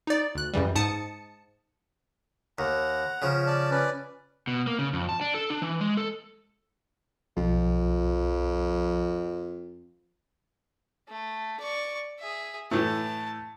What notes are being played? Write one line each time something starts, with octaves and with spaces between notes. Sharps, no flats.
D#4 D5
D2 F#6
F#2 C#3 E3 G3
G#2 A5 D#6 C#7
D#2 F#5 A#5
C#3 F3
D5 A5
C#4 B4 D5
B2
A#3
C#3
F2
A5
D4
A4
D4
E3
G#3
A4
B1 F2 F3
A3
D5 C#6
G#4 E5
A2 E3 A3 A5